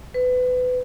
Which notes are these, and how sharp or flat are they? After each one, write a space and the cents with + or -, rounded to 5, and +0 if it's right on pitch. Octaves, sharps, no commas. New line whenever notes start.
B4 +25